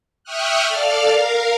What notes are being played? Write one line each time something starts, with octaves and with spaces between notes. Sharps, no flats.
E5 G5 C#6 D#6 F6 F#6
A4 D5 F5 F6
A#4 F5